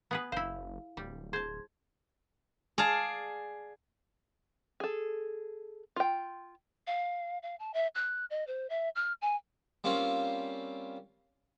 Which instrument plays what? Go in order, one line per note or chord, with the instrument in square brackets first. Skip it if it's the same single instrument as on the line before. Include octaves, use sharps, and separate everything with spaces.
[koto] B3 G#4 B4
[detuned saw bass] F#1 [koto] E4 C5 [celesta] F5
[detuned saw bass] D1 [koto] G3
[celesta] G#4 C6 G#6 [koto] C5 A5
[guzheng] G#4 D5 F5 A5
[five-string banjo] G#4 A4
F4 G5
[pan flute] F5
F5
A5
E5
F#6
D#5
C5
E5
F6
G#5
[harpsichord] G3 A#3 C4 C#4 F4